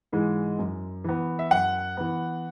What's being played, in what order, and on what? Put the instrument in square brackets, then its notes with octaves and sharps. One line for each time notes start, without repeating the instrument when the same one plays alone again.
[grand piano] G#2 E3 G#3
F#2
E3 B3
E5
F#2 F#5
E3 B3